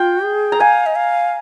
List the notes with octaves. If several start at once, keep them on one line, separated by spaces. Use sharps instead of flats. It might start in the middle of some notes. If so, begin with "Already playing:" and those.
Already playing: F4 G5
G#4
A#5
F5 G#5
D#5
F5